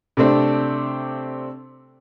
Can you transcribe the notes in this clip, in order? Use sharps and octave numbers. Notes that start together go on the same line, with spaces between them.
C3 A3 C4 D4